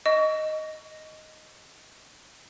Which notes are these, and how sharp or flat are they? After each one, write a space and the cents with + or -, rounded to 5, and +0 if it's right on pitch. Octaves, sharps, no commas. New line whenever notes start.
D#5 +0 C#6 +30